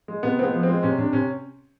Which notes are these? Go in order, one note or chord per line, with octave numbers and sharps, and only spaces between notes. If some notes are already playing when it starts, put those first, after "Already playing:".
G#3
C3 B3
G#3 B3 C4
F3
G#3 C4
C3 C#4
C3 D4
C3 C#4